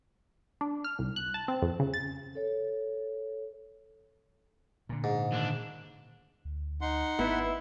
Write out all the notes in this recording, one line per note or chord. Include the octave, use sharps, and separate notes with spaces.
D4
F6
C2
F#6
A5
C4
F2
C#3
A6
A4 C#5
A#2 D3
G#2
D#2 D4
D2
D#4 F#5 C6
G#1 B3 E4